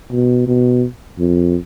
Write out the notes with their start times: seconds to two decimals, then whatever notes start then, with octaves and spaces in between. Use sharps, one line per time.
0.12 B2
0.47 B2
1.19 F2